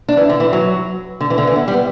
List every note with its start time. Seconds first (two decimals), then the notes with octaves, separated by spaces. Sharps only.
0.08 D4
0.17 E3
0.30 D3
0.40 E3
0.53 F#3
1.20 D3
1.30 E3
1.38 D3
1.47 E3
1.56 B3
1.68 G3
1.74 B3